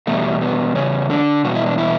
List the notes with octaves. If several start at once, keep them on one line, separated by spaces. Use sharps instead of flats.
E2 B2 G3 A3
B3
C#3 C#4
D3 D4
E2 B2 G3 F#4
E4
D4
E3 E4